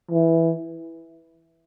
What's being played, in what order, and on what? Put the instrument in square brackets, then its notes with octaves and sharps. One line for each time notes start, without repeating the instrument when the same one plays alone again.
[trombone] E3